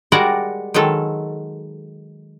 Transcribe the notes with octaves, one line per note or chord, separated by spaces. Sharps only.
G3 G#3 F#4 A#4 D5 F#5
D#3 F#3 G#3 A4